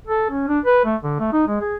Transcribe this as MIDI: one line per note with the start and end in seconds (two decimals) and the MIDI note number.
0.07 0.27 69
0.30 0.45 61
0.48 0.59 62
0.65 0.81 71
0.85 0.96 57
1.03 1.17 50
1.20 1.28 57
1.32 1.46 63
1.47 1.60 56
1.61 1.76 68